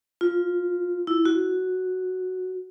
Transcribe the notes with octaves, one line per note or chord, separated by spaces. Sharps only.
F4
E4
F#4